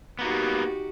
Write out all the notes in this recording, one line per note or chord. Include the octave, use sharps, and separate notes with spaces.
A#3 B3 D#4 F#4 G4